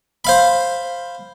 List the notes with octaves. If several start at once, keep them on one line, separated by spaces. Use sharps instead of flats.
C5 F5 B5